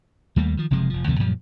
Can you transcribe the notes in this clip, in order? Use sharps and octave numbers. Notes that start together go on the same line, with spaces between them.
D#2 G3 A3 A#3
D#3 F3
F#1 C3 F3 G#3
F1 F3
D2 C3 F3 A3
F#2 A#2 F3 G3